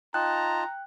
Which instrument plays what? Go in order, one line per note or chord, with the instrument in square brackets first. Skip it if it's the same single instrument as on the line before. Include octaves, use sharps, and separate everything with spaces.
[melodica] D#4 A5 [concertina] F4 [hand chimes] G5 F#6 [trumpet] A#5